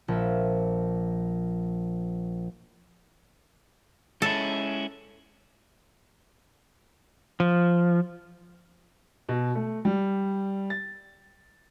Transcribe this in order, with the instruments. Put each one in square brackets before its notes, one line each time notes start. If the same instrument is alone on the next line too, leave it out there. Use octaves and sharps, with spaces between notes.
[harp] A#1 E5
[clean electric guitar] G#3 C#4 E4 [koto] A4
[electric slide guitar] F3
[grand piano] B2
A3
G3
A6